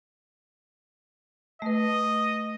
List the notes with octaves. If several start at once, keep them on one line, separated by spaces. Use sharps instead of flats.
A3 B4 D#5